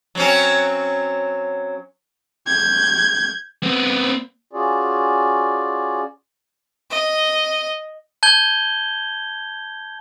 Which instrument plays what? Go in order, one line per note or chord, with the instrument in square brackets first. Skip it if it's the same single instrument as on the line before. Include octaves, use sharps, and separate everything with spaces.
[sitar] F#3 C4 C#4
[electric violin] G6 G#6
[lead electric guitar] B3 C4
[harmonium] C#4 F4 F#4 G#4 D5
[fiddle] D#5
[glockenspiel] A5 G6 G#6 G7